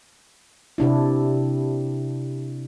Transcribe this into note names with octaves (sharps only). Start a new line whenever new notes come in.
C3 D4 E4